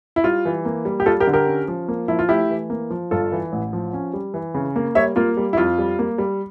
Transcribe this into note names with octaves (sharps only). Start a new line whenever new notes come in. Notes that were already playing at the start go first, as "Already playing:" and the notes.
E4
G3 F4
E3
A#3
G3
G4
G3 F4 A4
G4 A#4
D3
G4 A#4
C#4
F3
A#3
F3 E4
F4
A3 E4 G4
E3
A#3
F3
G1 F4 A4
E3
A1
F3
C#4
G3
E3
C#3
A#3
G3 C#5 E5
A#3 F4
G3
E4
F2 F4
G3
A#3
G3